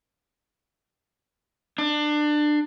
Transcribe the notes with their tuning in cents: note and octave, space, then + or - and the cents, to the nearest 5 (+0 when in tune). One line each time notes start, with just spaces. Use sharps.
D4 +25